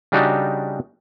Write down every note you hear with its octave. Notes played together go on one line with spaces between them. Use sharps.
C#3 G3 D4 D#4 F#4 G4